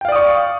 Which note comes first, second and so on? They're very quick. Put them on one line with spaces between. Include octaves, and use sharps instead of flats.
G5 F5 D5 D#6 C#6